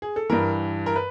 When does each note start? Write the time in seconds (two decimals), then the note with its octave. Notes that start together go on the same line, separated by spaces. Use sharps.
0.02 G#4
0.16 A4
0.30 G2 E3 A#4
0.86 A#4
0.96 B4